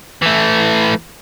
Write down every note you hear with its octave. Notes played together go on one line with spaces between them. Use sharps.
E3 A3